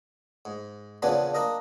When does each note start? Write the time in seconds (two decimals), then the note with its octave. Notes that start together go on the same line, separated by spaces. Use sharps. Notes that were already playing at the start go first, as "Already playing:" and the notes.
0.45 G#2
1.02 E2 A#2 C#3 F3 B3 D4
1.34 A#3 D4 A#4 D#5